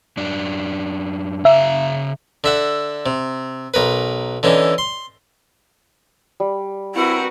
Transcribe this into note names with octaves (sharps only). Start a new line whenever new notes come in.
F#2 D4
C#3 E5 F5 A#5
D3 E5 F#5
C3
B1 A#4 B4
D3 E3 C#4 D#4
C6
G3
C4 E4 F#4 A#4 B4 F#5